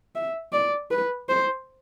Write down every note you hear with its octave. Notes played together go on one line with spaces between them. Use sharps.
E5
D5
B4
C5